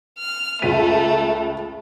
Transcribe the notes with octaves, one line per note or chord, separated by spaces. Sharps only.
F6
C#2 A3 B6 D#7